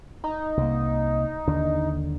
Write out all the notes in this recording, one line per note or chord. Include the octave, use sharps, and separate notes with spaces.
D#4
C2 A#3
D#2 D3 D4